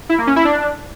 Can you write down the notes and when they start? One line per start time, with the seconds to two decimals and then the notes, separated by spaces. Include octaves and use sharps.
0.09 E4
0.18 A#3
0.27 C#4
0.36 E4
0.45 D4